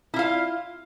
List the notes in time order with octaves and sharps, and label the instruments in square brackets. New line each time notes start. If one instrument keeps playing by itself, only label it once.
[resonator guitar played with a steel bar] E4
F4
F5